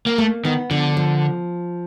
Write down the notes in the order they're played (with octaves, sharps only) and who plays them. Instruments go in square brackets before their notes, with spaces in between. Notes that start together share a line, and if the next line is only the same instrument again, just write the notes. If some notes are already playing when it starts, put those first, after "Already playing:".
[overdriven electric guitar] A#3
[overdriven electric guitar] A3 [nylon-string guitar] A#3
[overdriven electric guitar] D#3 [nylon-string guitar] B3
[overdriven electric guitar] D3 [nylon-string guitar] F3
[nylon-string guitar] F3